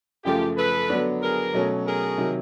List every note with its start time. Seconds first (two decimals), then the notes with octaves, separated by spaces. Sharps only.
0.24 F#2 C#3 F3 A3 F4 G4
0.57 A4 B4
0.90 D3 F#3 B3 D4
1.22 G#4 A#4
1.54 B2 F#3 A3 C#4
1.86 G#4 A#4
2.18 C3 D#3 F#3